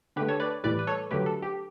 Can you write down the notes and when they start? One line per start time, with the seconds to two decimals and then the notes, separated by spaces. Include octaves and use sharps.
0.16 D3 A3 G4 B4
0.29 A4 C#5
0.40 B4 D5
0.64 A2 E3 G3 B4 D5
0.79 B4
0.87 A4 C#5
1.11 D3 F#3 A3 G4 B4
1.26 A4
1.42 G4